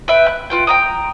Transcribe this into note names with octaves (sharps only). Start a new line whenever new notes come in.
B4 E5 G5
F#6
F4 B4 G5
G5 A#5 D#6